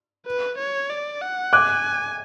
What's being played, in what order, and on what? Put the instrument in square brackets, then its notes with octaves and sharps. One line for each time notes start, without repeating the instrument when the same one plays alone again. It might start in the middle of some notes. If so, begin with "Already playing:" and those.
[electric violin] B4
C#5
D5
F#5
[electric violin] G#5 [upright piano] D6 F#6